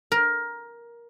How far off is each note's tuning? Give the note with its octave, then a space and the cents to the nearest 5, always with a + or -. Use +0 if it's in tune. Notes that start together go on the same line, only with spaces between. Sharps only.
A#4 +15